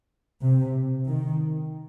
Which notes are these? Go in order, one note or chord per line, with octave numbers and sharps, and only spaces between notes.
C3
D#3